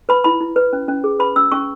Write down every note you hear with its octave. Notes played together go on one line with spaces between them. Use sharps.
B4 B5
E4 B5
E4
B4
C#4
C#4
G#4
B4 B5
C#4 E6
C#4 C#6